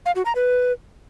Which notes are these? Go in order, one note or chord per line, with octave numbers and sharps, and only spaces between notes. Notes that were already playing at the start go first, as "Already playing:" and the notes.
F5
F#4
A#5
B4